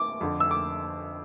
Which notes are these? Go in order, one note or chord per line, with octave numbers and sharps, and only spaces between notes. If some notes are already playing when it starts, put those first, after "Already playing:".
Already playing: D6
F2 D3
E6
D6